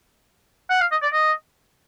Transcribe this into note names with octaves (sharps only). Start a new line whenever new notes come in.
F#5
F5
D#5
D5
D#5